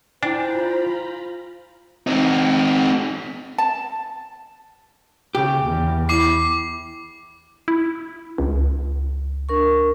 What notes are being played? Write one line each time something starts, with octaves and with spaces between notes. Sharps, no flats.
D4 E4 F4 C5 G5 G#5 A#5 B5
C4 D#4
A5
C#3 G4
E2
E4 D6 C7
E4
C#2
D4 A#4 C#6